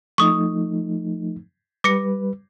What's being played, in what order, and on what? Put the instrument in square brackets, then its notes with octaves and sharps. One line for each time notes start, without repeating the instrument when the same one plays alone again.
[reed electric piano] F3 A3 D#4 [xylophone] C#6 D#6
[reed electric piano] G3 B4 [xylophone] D6 A#6 C#7